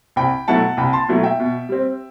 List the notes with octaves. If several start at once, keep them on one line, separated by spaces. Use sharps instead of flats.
C2 G5 B5
B2 F#3 A3 E4 F#5 A5
C2 G5 B5
A5 C6
B2 F#3 A3 E4
E5 G5
B2
G3 C4